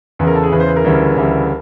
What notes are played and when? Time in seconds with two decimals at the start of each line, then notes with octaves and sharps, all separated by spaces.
0.19 E2 C#3 E3 B4
0.27 A#4
0.35 A4
0.43 G#4
0.52 E2 C#3 E3 B4
0.60 C5
0.68 B4
0.76 A#4
0.84 D2 C#3 E3 G3
1.16 D2 C#3 E3 G3